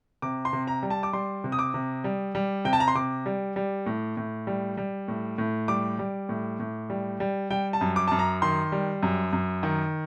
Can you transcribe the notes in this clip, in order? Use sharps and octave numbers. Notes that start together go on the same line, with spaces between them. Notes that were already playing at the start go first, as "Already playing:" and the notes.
C3 D6
C6
C3
A#5
G3
A5
D6
G3 C6
C3
D#6
D6
C3
G3
G3
C3 G5
A5
A#5
C6
C3 D6
G3
G3
A2
A2
G3
G3
A2
A2
G3 D6
G3
A2
A2
G3
G3
G3 G5
A5
F#2
D6
F#2 A5
A#5
D#3 C6
G3
F#2
F#2
D#3